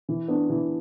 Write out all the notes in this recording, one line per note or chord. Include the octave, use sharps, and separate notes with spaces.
E3
B3 D4
E3